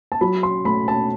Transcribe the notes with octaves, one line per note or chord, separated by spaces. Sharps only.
A5
F#3 B5
C6
A3 B5
A5